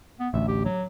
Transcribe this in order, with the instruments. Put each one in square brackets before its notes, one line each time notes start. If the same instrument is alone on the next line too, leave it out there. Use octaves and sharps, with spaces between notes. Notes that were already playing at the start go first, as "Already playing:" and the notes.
[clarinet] B3
[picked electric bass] A1 D2 [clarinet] E5
[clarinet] G4
F#3